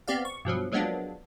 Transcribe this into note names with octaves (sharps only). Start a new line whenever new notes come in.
B3 C4 G4 D5 F5
C#6
G2 B2 F3 F#3
F3 F#3 G#3 A#3 B3 D4